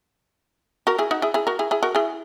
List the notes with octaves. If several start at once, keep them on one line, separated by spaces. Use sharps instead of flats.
F#4 A#4
E4 G#4
D#4 F#4
E4 G#4
E4 G#4
F#4 A#4
E4 G#4
E4 G#4
F#4 A#4
E4 G#4